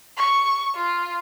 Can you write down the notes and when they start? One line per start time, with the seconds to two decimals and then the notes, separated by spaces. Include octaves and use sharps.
0.17 C#6
0.75 F4